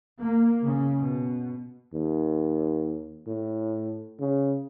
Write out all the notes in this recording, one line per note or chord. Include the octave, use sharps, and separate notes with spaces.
A#3
C#3
B2
D#2
A2
C#3